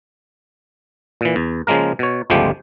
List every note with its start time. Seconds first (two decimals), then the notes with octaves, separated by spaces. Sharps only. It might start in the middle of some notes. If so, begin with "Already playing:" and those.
1.21 A#2 E3
1.36 E2
1.67 C#3 F3 G#3 A#3 A#4
1.99 B2 C#5
2.30 G1 C#2 F3 G#3 A3 G4